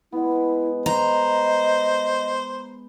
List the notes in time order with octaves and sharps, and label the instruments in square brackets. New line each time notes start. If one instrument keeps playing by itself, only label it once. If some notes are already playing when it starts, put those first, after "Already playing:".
[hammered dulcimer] G#3 B3 [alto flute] E4
[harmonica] C5 [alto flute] D#5 [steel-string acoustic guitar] A#5